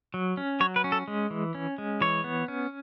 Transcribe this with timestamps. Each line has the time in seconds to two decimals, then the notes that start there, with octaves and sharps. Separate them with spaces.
0.14 F#3
0.37 C#4
0.60 F#3 C#5
0.76 B4
0.84 C#4
0.92 A4
1.08 G#3
1.30 E3
1.55 C#4
1.78 G#3
2.01 E3 C#5
2.24 B3
2.48 C#4